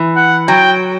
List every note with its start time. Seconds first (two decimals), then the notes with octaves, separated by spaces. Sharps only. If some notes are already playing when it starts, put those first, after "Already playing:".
Already playing: E3
0.16 F#5
0.48 F#3 G5